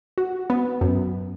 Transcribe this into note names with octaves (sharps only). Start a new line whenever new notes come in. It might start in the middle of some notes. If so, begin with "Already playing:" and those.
F#4
B3
F#2